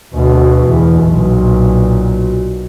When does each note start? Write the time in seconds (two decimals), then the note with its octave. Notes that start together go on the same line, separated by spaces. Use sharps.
0.14 D2 B2
0.67 E2
1.04 B1 A#2